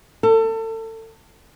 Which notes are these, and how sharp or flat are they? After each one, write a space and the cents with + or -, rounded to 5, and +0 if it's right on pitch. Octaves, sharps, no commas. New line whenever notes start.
A4 +30